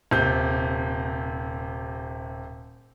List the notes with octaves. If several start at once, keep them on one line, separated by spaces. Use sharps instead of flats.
D#1 C3 G6